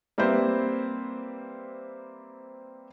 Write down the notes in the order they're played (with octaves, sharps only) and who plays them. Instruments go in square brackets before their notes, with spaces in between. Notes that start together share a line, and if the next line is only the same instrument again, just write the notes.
[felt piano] G3 A#3 C4 E4 B4 C5